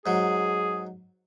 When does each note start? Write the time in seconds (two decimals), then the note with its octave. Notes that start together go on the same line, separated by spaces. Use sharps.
0.06 G#2 F#3 G#4